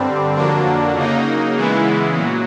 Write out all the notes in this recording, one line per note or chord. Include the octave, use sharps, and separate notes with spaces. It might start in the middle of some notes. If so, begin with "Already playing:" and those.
Already playing: G2 D3 G3 C4
F2 D3 F#3 A#3 D4
C#3 F#3 A#3 D#4
C#3 E3 G#3 B3 E4
A#2 F#3